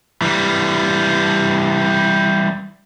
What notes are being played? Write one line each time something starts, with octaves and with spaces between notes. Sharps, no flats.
E3 G3